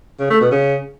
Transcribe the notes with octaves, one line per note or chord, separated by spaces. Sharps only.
C#3
A3
B2
C#3